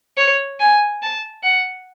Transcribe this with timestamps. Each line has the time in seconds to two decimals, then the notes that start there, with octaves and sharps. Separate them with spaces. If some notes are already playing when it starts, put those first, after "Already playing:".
0.17 C#5
0.60 G#5
1.02 A5
1.43 F#5